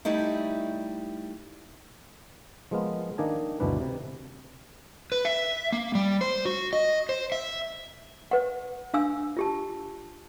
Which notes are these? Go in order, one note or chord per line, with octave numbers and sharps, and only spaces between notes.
G3 A3 D#4 E4
F3 G#3 A#3 B3 F4
D#3 A#3 D4 D#4 G#5 A#5
G1 D2 B2 E3 D4 B4
C3
B4
E5
A#3
G3
C5
F#4
D#5
C5
E5
B4 F#5
D4 F5 G#5 E6
F4 G4 A5